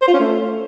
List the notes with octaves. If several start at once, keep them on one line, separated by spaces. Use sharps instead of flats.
C5
F4
C#4
A3